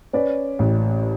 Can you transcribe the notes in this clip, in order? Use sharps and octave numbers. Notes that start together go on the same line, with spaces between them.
C#4 B4 D5
A1